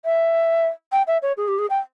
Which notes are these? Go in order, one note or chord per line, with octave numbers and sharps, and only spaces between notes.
E5
G5
E5
C#5
G#4
G4
G#4
G5